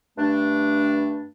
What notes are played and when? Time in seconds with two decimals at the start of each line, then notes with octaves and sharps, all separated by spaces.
0.17 G2 A3 D4